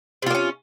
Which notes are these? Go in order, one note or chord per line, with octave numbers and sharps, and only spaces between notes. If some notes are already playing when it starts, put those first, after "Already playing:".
C3 A#3 C#4 F4